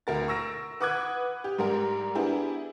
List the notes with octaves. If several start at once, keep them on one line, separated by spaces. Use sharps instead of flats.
D2 A#4 A6
C#6 E6 A#6 D7
B4 F#5 D6 D#6 F#6 G#6
G4
G#2 G3 A#4 A#5
B3 D4 E4 G4 G#4